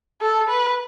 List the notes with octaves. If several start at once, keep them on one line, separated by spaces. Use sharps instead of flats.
A4
B4